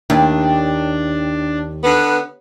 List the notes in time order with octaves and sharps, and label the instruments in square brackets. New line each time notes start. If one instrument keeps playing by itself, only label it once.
[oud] D#2 [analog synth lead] D4
[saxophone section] D3 B3